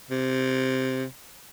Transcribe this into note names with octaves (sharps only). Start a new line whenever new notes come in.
C3